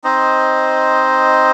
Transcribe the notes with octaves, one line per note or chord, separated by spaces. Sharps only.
C4 D#4 C5 D#5